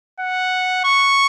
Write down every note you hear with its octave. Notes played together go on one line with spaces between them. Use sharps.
F#5
C#6